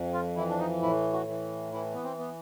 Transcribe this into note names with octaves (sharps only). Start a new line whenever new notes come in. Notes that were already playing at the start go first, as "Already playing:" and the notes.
Already playing: F2
F4
E3 E4
D4
D#4
A2 E4
F#4
E3
E3 E4
B3
C4
B3